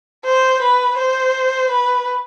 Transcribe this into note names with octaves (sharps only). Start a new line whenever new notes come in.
C5
B4
C5
B4